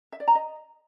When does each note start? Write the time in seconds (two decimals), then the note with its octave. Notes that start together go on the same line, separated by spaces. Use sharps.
0.12 E5
0.20 D5
0.28 A#5
0.35 D#5